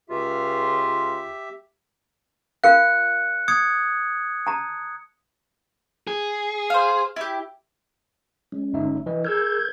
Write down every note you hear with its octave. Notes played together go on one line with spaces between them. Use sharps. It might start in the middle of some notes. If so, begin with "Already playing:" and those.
C#2 F4 G4 E5
F4 A#4 F5 F#6 C#7
D#6 G#6 C#7
A5 A#5
G#4
C5 F5
E4 G4
G#3 C#4
G1 D#4 E5
E3 B4 D#5
G#4 A#4 E6 F6 G6 G#6